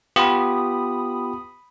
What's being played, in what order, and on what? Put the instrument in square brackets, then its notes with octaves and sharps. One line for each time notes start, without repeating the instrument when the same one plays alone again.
[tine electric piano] B3 F4 G4 [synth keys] B5 D#6